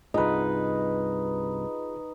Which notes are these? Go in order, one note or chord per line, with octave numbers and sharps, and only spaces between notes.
C2 G2 D#4 F4 G#4 B4 D#5